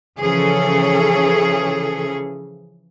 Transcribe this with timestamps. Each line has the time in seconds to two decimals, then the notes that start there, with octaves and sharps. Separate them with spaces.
0.20 C#3 E3 F3 C#4 G#4 A4